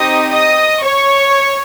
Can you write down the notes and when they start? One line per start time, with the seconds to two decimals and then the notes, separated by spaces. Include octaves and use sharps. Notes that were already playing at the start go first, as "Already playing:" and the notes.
Already playing: C4 D#4 G4 D#5 D#6
0.31 D#5 D#6
0.83 C#5 C#6